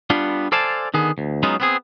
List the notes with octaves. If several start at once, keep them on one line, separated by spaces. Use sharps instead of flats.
G3 B3 D4 F4
A4 C5 D5 F5 G#5 A5
D3 D#3 B3 G#4
D2
F#3 G#3 B3 C#4 D#4 F4
B3 C4 G#4